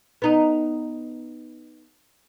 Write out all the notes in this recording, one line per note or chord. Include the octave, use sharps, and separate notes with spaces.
B3 D#4